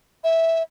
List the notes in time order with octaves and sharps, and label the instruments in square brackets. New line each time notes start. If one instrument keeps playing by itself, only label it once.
[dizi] E5